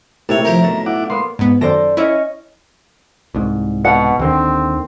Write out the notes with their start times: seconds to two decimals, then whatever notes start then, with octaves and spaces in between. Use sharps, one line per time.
0.29 A2 C3 A#3 E4 G4 C#5 A5
0.45 F3 G4 A#4 A#5
0.62 B1 F#3 A5
0.86 E4 F#5 D6
1.10 A#3 B3 C6
1.39 G#2 B3
1.61 F#2 D#3 A4 C5 D5 A#6
1.97 C#4 E4 C#5 D#5
3.35 C2 G#2
3.85 B2 F#5
4.19 D#2 D3 D#3 C4